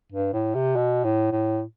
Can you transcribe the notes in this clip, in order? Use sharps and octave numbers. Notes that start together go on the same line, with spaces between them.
G2
A2
C3
B2
A2
A2